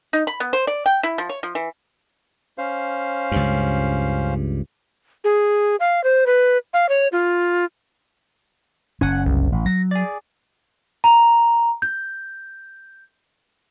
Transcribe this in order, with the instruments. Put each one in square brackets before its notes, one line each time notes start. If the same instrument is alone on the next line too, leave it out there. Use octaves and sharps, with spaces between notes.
[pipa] D#4
B5
B3
C5
D5
G5
E4
F3
C#5
F3
E3
[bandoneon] C#4 C5 F5
[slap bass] C#2 G2
[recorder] G#4
F5
C5
B4
F5
C#5
F4
[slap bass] F#1 C#4 [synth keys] F#5 G#5
[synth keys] C2
[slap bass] A1
[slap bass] F#3 [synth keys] A#6
[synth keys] G#4 D5
[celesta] A#5
G6